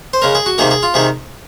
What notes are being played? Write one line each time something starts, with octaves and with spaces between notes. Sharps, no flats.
C5
C#3 G#3 A#4
G#4
F#4
C3 D#3 A#3 G#4
G#4
F4
C3 D#3 G#4